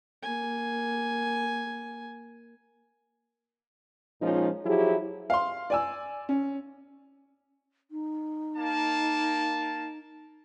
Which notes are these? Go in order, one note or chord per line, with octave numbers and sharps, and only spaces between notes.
A#3 G#5
A#2 F3 G#3 C#4 D#4 F4
F3 F#3 E4 G4 G#4
F5 C6
D5 G#5 E6
C#4
D#4
A#3 A5